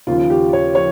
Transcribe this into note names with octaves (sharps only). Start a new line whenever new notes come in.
D#2 C#3 F3 F4
G4
C#5
F3 C#5